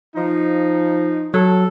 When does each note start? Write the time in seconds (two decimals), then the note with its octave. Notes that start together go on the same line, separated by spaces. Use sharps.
0.16 F3 D#4
1.34 F#3 A4